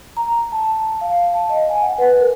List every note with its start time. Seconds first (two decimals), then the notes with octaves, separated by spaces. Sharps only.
0.17 A#5
0.52 A5
1.01 F5
1.34 A5
1.49 D#5
1.69 G#5
1.82 F#5
1.98 B4
2.20 A#4